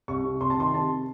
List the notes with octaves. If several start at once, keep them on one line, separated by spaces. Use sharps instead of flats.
C2 C#6
C3
C2 C6
A5
D#3 C6
C3 A5